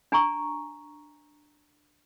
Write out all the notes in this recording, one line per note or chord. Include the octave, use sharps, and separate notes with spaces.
D4 G#5 A#5 C#6